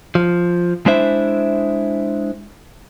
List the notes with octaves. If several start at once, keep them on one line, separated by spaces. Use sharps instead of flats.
F3
G#3 D4 E4 C5 E5